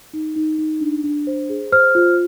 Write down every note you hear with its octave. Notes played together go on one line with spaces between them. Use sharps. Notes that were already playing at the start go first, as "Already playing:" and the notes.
D#4
D#4
D#4
D4
D4
C5
G#4
C5 F6
F4